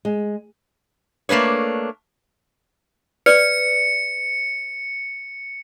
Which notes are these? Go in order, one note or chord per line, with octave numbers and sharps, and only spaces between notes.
G#3
A3 A#3 D4 B4 C#5
B4 D5 C#7